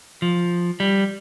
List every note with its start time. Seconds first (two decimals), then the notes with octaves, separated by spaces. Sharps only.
0.22 F3
0.80 G3